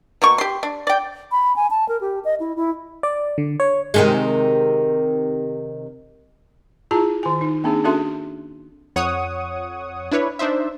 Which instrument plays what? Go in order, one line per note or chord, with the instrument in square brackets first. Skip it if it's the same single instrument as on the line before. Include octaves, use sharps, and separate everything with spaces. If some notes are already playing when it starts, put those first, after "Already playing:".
[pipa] B2 A#3 C#6
G4 C6
D4
D5 G5
[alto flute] B5
G#5
A5
A#4
G4
D#5
E4
E4
[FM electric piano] D5
D3
C#5
[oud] C3 D#3 G#3
[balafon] E4 F4 G#4 A5 A#5
D#3 G#5
D#4
A#3 C4 D4 D#4 G#4
C#4 D4 F#4 A4 E5 C6
[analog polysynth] F2 C#5 F#5 C#6 D#6
D4 E4 B4 C#5
D4 D#4 C5 E5